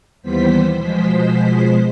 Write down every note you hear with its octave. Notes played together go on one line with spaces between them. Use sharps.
D#2 E3 G3 B3 C5 B6
B2 F3 G#3 C5 B6